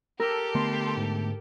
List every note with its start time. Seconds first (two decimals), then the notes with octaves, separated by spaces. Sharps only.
0.20 G4 A4 A#4 E6
0.55 D3 A3 B3 C6
0.97 G#2